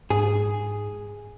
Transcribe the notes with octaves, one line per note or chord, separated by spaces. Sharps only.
G#2 G#4